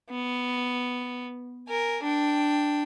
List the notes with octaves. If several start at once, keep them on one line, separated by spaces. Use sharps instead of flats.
B3
A#4 G#5
D4 G5